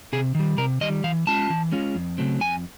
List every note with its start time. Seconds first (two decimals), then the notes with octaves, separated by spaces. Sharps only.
0.13 C3 G#4
0.35 D#3 G3
0.57 C3 A#4
0.81 D#3 G3 D#5
1.04 E3 F5
1.27 G#3 C#4 F4 A5
1.50 E3
1.72 G#3 C#4 F4
1.95 F2
2.18 C#3 F#3 A3 C4
2.41 F2 G#5